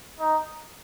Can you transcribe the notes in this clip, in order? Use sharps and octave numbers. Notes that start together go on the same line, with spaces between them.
D#4